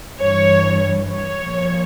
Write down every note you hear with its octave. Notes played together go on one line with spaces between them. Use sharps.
G2 E3 C#5
C#5
A#2 F3